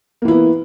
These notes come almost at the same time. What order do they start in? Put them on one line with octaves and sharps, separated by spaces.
A#3 E3 E4 B3